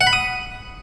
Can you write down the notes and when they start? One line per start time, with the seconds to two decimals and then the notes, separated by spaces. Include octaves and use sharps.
0.01 F#5
0.07 B5
0.13 D#6